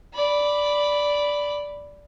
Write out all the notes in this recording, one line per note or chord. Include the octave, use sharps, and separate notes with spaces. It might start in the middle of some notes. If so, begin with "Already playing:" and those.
D5 B5